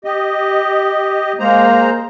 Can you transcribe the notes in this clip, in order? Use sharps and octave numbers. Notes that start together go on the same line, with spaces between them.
G4 D#5
G#3 A#3 C5 A#5